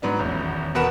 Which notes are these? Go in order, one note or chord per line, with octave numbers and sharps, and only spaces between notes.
G#2 F#3 B3 D4
D#1 A1 E2
E1 B2 A#4 B4 F#5 E7